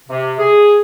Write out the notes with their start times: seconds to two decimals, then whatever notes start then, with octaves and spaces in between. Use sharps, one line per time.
0.09 C3
0.39 G#4